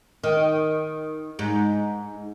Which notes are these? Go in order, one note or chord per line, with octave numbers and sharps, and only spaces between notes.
D#3
G#2